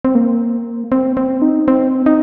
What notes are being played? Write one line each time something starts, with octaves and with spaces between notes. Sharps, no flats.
C4
A#3
C4
C4
D#4
C4
D#4